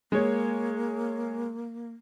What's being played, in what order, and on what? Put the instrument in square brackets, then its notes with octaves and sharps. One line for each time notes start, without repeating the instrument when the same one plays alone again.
[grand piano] G#3 C#5 [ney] A#3